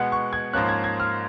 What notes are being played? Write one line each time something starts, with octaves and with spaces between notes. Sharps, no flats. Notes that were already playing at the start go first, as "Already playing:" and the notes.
Already playing: B2 G#3 B3 F#5
C#6
G#6
G#2 F3 A#3 C#4 F#6
G#6
G#6
F6